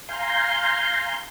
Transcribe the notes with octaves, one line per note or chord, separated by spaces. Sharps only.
F5 G#5 A#5 C6 G6